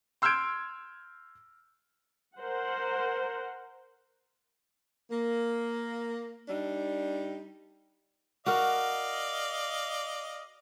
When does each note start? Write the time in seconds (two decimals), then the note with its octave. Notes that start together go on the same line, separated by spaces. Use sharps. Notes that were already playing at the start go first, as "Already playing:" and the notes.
0.22 C6 E6 F6 G6 G#6 D7
2.39 A#4 C5 F#5
5.11 A#3
6.48 G3 D4 D#4
8.46 F#4 A#4 D5 D#5 F5